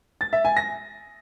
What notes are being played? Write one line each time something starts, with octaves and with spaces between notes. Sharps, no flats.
A6
E5
G#5
A#6